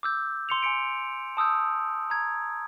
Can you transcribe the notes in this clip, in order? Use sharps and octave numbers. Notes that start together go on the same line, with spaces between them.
D6 E6 G6
C6 C#7 F7
G#5 C6 C#7 D7
A5 D#6 E6 G6
A#5 G#6